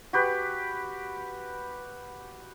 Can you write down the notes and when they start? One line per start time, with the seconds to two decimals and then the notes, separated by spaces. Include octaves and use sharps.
0.13 F#4 G4 B4